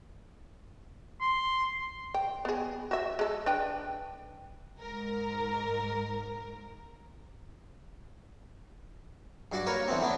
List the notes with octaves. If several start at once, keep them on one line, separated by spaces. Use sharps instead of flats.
C6
G5
B3 G#4
F#4 E5
G#3 A4
D4 B4 G5
G#2 A#4
G2 F#4 D5
A#3 A#4 B4 C#5
D3 E3 B3 C4
A2 B3 D4